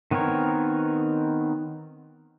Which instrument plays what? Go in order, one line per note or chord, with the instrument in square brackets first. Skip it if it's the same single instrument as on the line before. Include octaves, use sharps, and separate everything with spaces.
[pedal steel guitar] D#3 B3 C4 A#4 C#5